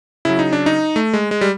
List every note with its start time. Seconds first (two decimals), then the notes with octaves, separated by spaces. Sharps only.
0.25 C#3 F#3 E4
0.39 D#4
0.53 D4
0.66 D#4
0.96 A3
1.14 G#3
1.31 G#3
1.41 G3